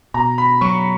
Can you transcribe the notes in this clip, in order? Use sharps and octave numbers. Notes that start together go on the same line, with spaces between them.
B2 A#5
B5
F#3 C#6